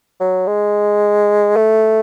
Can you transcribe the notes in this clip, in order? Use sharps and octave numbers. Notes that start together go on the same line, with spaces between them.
F#3
G#3
A3